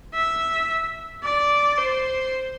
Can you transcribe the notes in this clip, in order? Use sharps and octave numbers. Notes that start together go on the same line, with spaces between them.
E5
D5
C5